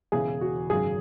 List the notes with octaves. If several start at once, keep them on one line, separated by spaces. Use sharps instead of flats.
E1 E2 C#3 E3 G#4
F#4
G#1 F#2 C#3 F#3 G#4